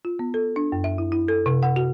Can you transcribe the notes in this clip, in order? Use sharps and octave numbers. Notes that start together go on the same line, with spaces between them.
F4
B3
A4
D4
F#2
E5
E4
E4
A4
C3
F#5
F#4